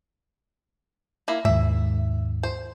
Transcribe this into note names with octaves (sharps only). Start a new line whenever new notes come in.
A#3 E4
D#2 G#2 E5
C5